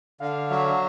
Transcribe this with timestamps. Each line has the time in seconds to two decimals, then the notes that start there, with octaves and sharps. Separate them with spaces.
0.20 D3 F5
0.50 F#3 E5